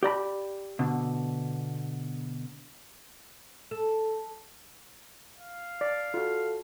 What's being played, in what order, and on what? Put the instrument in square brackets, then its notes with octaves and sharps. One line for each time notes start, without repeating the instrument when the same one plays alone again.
[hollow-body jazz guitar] G4 D5 A#5 B5
B2 D3
[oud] A4
[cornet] F5
[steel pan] D5
[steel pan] F4 F#4 [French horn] A4